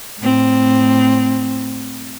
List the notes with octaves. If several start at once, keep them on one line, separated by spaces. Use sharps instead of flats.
A2 C4